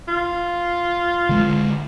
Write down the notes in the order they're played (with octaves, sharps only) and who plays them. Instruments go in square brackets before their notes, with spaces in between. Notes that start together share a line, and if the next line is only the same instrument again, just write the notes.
[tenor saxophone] F4
[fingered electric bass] D3 G#3